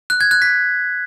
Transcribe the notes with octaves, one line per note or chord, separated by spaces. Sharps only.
F#6
G#6
F#6
B6